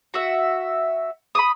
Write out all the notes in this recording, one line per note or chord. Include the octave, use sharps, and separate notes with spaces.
F#4 E5
B5 D6 D#6